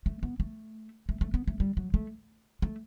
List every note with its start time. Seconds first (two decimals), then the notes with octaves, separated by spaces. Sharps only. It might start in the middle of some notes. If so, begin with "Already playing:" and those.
0.06 A3
0.23 B3
0.40 A3
1.09 A3
1.21 A3
1.34 B3
1.48 A3
1.60 G3
1.77 F#3
1.94 A3
2.62 A3